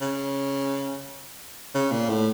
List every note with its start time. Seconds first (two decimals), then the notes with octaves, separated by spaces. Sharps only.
0.01 C#3
1.74 C#3
1.92 A#2
2.09 A2